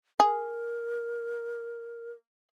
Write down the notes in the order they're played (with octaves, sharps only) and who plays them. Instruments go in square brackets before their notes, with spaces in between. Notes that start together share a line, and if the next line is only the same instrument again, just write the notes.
[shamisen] G#4 [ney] A#4